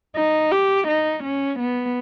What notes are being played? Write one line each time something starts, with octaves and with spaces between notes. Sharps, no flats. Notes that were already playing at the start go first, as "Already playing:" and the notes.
D#4
G4
D#4
C#4
B3